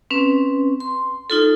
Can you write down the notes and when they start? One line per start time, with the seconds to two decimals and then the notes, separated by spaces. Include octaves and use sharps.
0.10 C4 C#4 B4
0.80 C6
1.30 D#4 F4 A4